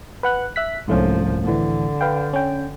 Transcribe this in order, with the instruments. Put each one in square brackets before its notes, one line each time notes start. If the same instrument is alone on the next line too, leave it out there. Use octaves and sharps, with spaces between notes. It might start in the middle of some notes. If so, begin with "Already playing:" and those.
[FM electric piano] B4 F#5 F#6
E5 F#6 B6
[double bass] C2 F3 [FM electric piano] G#2 A3 C#4
[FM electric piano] A2 E3 [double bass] D3
[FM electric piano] B4 F5 G5
C#4 G5